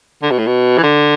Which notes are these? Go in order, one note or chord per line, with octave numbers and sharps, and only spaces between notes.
D3
B2
A2
B2
E3
D3